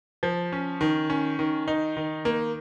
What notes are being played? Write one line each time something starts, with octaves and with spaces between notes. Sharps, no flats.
F3
C#4
D#3
C#4
D#3
D#4
D#3
A#3